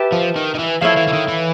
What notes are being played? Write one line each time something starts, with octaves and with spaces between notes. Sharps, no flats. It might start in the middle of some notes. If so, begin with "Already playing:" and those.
Already playing: G4 B4 E5 A5
F3
D#3
D#3
E3
F3 E4 A4 C#5 F5
E3
E3
D#3
E3